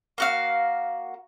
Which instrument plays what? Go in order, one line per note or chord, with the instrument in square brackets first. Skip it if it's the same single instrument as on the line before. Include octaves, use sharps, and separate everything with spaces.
[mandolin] A#3 F#4 F5